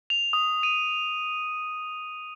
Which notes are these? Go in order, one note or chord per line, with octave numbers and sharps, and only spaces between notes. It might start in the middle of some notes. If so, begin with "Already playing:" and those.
F7
D#6
D#7